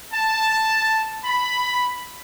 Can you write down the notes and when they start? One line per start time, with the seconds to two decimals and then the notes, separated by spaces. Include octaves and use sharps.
0.13 A5
1.24 B5